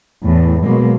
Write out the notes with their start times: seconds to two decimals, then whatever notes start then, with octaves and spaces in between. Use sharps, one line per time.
0.23 E2 A2
0.63 B2 F#3 G#3 A#3